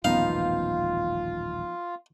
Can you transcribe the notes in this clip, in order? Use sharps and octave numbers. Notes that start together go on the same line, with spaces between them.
D#1 A1 F#2 F3 B3 D#4 F4 F5